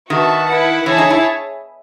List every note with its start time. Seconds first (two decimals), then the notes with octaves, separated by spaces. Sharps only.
0.10 D#3 F#4 B4 E5 A5
0.48 E4 B4 F#5
0.86 E3 G#4 C#5 E5 A5
0.98 D#4
1.10 E4